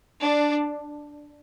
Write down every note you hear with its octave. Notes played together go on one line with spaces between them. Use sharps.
D4